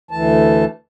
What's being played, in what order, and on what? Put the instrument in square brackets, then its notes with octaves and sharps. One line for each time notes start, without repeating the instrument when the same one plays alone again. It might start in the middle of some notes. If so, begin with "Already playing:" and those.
[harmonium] D2 E3 A5